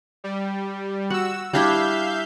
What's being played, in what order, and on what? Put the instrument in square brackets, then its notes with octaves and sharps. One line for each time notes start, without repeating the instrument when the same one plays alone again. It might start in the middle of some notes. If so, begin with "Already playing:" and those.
[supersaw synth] G3
[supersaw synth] F#4 E6 [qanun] F#5
[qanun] G3 D4 E4 [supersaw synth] E5 F5 G6